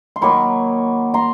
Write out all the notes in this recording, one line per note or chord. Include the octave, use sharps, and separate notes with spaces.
C6
D#3 F#3 A#3 B5 C#6
A#5 C6